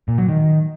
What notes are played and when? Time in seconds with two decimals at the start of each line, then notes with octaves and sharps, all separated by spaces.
0.08 A#2
0.18 F#3
0.29 D#3